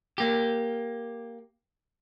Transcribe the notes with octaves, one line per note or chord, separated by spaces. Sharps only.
A#3 G4